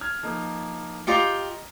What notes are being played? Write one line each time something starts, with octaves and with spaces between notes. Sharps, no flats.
F6 G#6
F3 A#3 D#4
F4 G4 D#5 G5 A#5 C#7